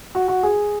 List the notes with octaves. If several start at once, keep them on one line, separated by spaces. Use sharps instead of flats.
F#4
F#4
G#4